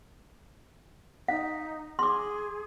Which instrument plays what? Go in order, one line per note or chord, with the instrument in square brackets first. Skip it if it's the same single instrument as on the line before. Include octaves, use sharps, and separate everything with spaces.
[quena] D#4 [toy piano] F5
[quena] G#4 [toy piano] C6 D6